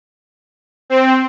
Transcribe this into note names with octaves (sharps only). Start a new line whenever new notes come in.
C4